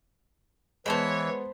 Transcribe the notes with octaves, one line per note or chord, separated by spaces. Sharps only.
E3 G#3 B3 C5 C#5 A5 B5 F7